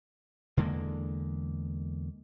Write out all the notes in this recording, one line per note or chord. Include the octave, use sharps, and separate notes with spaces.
E2 D3 G#3 A#3